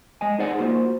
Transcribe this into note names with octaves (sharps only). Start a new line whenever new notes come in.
G#3 D#5 G#5
D#4 G#4 C5 D5 F#5
A#3 F4 F#4 C5